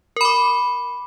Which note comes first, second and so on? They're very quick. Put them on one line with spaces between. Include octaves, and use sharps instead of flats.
A#4 B5 D6